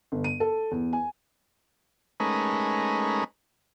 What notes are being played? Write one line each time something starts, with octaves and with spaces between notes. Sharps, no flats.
G1
D#7
A4
E2
G#5
G#3 A3 C#4 D#4 A#4 B4